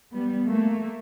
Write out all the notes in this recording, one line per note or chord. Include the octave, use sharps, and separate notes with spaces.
G3 B3
A3 A#3